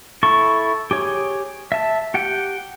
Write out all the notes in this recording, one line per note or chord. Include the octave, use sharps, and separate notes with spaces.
E4 A4 C#6
G4 G#4 C#5
E5 A5
G4 F#5 G5